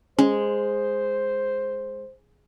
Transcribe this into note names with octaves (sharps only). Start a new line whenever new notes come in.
G#3 C#4 C5